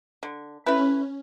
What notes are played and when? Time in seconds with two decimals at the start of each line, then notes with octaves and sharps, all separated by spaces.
0.23 D3
0.66 A3 C#4 E4 B4